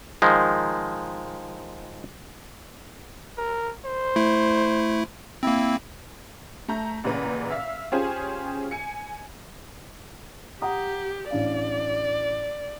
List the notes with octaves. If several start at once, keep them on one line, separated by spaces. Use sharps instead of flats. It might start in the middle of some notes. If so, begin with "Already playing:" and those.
D#3 F3 G#3
A#4
C5
A3 E4
A#3 C4 E4
A3 A5 A#5 G6
A1 A#2 C#3 B4 A#5
E5 F5
C#4 F4 G4 G#4 C5 G#5
G#5 C#7
G4 F#5 A#5 D#6
A1 D4 D5 F5